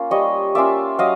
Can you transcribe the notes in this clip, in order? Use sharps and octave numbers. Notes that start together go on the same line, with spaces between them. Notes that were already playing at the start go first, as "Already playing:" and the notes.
Already playing: A#3 C#4 F4
G3 C#5 D#5
A#3 C#4 F4 D5 E5
F#3 D#5 F5